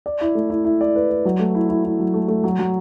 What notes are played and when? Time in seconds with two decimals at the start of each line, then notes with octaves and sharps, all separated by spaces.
0.06 D5
0.21 E4
0.35 A3
0.50 E4
0.65 E4
0.81 D5
0.96 B4
1.10 B4
1.25 F#3
1.39 A3
1.55 E4
1.69 E4
1.84 E4
2.00 F#3
2.14 A3
2.28 A3
2.44 F#3
2.59 F#3